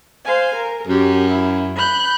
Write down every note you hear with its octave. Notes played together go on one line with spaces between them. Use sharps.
C5 F5 G#5
A#4
F#2 G4
E4
B5 F#6 G6